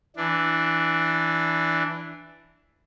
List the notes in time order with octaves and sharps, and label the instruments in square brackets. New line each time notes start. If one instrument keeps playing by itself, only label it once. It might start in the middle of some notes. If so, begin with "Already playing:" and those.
[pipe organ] E3 D4